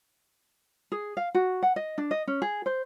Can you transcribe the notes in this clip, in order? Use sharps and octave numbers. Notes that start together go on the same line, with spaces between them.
G#4
F5
F#4
F#5
D#5
D4
D#5
C#4
G#4
C5